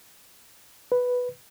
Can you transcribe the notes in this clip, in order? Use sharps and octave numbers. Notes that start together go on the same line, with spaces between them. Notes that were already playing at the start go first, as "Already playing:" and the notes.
B4